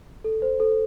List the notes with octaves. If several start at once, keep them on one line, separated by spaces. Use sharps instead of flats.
A4
C5
A4